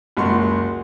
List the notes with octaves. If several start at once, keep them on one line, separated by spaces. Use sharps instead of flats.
F#1 C#2 F#4 C6 C#6